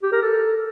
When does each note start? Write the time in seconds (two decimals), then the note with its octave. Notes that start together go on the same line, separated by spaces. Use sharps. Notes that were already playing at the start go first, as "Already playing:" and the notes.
0.02 G4
0.12 A#4
0.22 A4